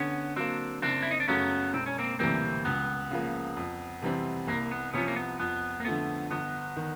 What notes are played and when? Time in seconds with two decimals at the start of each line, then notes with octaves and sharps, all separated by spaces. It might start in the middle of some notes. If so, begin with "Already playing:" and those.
Already playing: D3 B3 C#4
0.36 F#3 A#3 C4 D4
0.82 F#1 C4 D4
1.02 E4
1.11 D#4
1.20 D4
1.28 F#2 C#3 F#3 A3 B3 C#4
1.73 E1 C4
1.86 C#4
1.98 A#3 C4
2.19 D2 C3 E3 G3 A#3 C4
2.65 C#2 B3
3.11 C#3 F3 A#3
3.57 F2
4.02 C3 E3 G3 C4
4.47 C2 A#3
4.71 B3
4.93 C3 F3 B3 C#4
5.08 A#3
5.16 B3
5.39 F2 B3
5.80 A#3
5.85 D3 F3 A3 B3
6.31 G1 B3
6.76 D#3